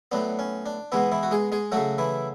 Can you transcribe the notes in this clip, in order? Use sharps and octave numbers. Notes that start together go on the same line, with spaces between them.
A2 F#3 B3 D4
C#4
D4
B2 E3 G#3 B3 E4
E3 E4
F#4
G#3 G#4
G#3 G#4
C#3 F#3 A3 F#4
E3 E4